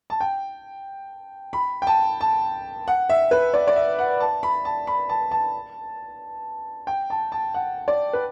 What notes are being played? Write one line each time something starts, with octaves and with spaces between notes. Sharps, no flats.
A5
G5
B5
G5
A5
A5
F#5
E5
B4
D5
D5
E5
F#5
A5
B5
A5
B5
A5
A5
G5
A5
A5
F#5
D5
B4